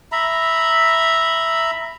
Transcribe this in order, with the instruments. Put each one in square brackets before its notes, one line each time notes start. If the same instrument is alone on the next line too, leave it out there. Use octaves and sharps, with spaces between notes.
[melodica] E5 A#5 B5